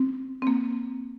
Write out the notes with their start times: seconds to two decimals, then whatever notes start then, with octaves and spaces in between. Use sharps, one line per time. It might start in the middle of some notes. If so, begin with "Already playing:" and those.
Already playing: C4
0.42 C4
0.47 A#3